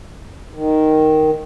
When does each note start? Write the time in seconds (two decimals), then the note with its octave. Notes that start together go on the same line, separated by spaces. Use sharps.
0.54 D#3